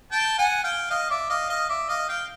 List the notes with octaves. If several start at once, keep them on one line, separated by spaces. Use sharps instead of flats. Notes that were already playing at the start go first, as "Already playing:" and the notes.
G5 A5
F#5 G#5
F5 G5
D#5 F5
D5 E5
D#5 F5
D#5 F5
D5 E5
D#5 F5
F5 G5